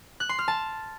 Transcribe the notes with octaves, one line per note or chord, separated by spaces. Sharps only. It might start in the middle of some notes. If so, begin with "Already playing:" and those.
F#6
C6
F6
A5